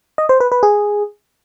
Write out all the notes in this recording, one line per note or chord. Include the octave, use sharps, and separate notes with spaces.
D#5
C5
B4
B4
G#4